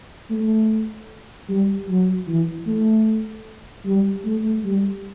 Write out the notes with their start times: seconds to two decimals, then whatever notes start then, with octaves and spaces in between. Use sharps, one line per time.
0.30 A3
1.49 G3
1.89 F#3
2.28 E3
2.67 A3
3.85 G3
4.25 A3
4.64 G3